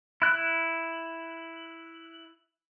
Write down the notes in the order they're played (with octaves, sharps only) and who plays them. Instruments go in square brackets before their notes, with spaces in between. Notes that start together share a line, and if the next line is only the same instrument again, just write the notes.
[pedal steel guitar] E4 F#6